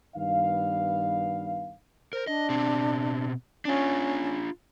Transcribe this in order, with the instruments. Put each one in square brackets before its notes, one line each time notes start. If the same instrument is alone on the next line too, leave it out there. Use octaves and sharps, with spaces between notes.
[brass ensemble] G2 D#3 B3 F5
[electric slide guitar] A#4 [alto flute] C5
[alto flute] D4 [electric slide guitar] D#5
[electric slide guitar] B2 C4
[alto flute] C#4 [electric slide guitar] D4 F4